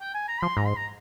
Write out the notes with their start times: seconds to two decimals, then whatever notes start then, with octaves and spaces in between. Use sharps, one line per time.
0.01 G5
0.14 G#5
0.28 A#5
0.42 F3 C6
0.57 G#2 A#5
0.66 C6
0.76 A#5